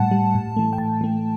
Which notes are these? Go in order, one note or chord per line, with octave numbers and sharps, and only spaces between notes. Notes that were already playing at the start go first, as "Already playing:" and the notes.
Already playing: A2 G3 F#5 A5
G3
A2
E3 A3
G5
A2 A5
E3 A3